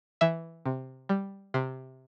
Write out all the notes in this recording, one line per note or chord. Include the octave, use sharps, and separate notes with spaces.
E3 E5
C3
G3
C3